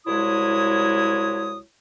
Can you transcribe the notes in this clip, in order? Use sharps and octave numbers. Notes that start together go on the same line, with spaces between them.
C2 F#3 G#3 E4 C#5 D#6